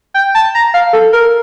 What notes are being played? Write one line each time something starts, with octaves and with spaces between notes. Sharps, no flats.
G5
A5
A#5
F5
A4
A#4